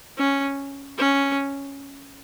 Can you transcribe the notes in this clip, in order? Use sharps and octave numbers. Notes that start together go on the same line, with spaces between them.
C#4
C#4